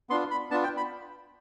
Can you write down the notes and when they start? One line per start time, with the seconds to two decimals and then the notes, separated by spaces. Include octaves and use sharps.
0.10 B3 D4 F4 C6
0.31 B5
0.51 B3 D4 F4 A5
0.64 G5
0.77 B5